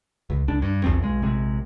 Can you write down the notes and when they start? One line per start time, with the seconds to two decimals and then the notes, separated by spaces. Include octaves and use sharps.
0.30 C#2
0.48 C#2 D4
0.62 G2
0.84 A#1 E2 F3 C4
1.02 B1 G#3
1.22 A#1 C3 G#3